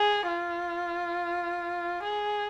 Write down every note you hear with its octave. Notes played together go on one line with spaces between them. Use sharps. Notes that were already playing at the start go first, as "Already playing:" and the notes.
Already playing: G#4
F4
G#4